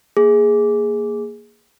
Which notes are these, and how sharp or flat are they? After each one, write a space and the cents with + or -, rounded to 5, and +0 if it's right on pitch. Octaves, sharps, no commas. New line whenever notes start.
A#3 +0 G#4 +0